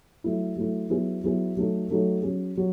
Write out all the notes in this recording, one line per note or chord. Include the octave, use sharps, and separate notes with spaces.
F#3 A3 E4
F#3 A3 E4
F#3 B3 E4 G#4
F#3 B3 E4 G#4
F#3 A3 D#4 A4
F#3 A3 D#4 A4
F#3 C#4 G#4
F#3